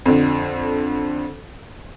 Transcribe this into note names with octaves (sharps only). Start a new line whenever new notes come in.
F2 D3